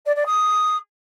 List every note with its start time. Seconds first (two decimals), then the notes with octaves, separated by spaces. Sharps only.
0.06 D5
0.16 D5
0.26 D#6